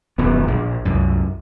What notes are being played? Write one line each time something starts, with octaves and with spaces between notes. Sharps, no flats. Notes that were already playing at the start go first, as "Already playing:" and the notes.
D#1 F#2 B3
A#1
C2 F#2